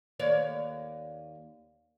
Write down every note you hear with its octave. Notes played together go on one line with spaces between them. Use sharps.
D#2 C#5 D5